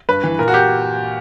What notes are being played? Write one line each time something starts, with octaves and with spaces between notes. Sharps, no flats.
G2 B4
E3
A#2 A#4
F#4
G4